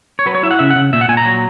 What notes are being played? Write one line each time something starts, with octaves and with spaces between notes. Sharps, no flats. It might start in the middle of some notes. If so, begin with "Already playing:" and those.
C#5
F#3 B4
C#5
E4 E5
F#5
C#3 E5
F#5
C#3
A#2 E5
F#5
A#2 G#5
A#5
F#3